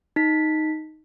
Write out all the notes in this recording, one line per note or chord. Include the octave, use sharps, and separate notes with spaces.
D#4 B6